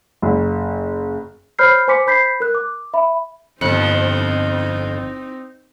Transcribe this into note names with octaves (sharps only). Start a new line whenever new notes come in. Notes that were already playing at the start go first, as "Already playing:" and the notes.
F#1
C5 C#5 B5 F6 G6 C7
C5 G#5 C6 D6 B6 C#7
C5 B5 G6 B6 C7
A#4 F#6
D6
E5 B5
G1 F2 F3 C4 D#4 F#6 C#7